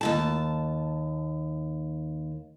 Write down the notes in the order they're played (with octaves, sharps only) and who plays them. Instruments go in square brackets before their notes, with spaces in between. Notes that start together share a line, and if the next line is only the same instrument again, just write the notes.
[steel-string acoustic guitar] D#2 G#2 A5